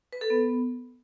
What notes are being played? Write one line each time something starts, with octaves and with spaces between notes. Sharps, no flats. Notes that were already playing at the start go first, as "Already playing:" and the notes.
B4
A4
B3